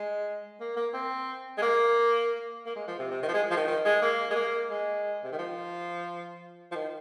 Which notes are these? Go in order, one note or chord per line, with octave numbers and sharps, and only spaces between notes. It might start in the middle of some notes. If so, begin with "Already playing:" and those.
Already playing: G#3
A#3
A#3
C4
G#3
A#3
A#3
G#3
F3
C3
C3
D#3
F3
G#3
F3
D#3
D#3
G#3
A#3
G#3
A#3
G#3
C3
D#3
F3
F3
D#3